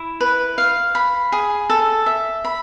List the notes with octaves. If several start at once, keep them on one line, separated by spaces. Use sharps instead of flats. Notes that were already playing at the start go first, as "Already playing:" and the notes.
Already playing: E4
B4
F5
B5
G#4
A4
E5
B5